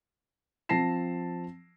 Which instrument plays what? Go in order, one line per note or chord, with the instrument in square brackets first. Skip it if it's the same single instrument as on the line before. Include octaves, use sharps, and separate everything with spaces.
[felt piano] F3 C4 A5 A#6 C7 E7